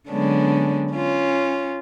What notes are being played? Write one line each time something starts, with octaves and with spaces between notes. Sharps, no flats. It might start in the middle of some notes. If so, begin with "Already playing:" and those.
D3 F#3 G#3 B3 C#4 D4
C#4 F4